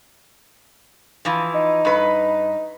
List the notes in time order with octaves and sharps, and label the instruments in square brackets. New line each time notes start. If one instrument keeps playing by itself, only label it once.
[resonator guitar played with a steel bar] E3 F3
[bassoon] D#4
[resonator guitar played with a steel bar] G2 B4